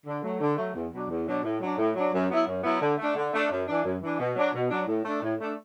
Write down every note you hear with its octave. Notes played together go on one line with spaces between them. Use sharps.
D3
F#3 A3
D3
F#3 A3
E2
B2 F#3 D4
E2
B2 F#3 D4
A2
F#3 D4
A2
F#3 D4
F#2
F#3 B3 E4
F#2
F#3 B3 E4
D3
A3
D4
D3
A3 D4
F#2
E3 D4
F#2
E3 D4
B2
F#3 D4
B2
F#3 D4
A2
A3 D4
A2
A3 D4